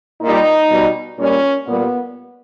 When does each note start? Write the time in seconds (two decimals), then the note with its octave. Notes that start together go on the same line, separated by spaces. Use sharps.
0.22 A#2 G3 D#4
0.70 B2 G3
1.19 A#2 G3 C#4
1.67 A#2 G3 B3